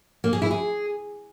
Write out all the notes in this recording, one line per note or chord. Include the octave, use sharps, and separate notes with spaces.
A#3
G#4
E4
G#4